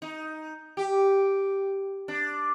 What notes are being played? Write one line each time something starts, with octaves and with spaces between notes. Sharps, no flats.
D#4
G4
D4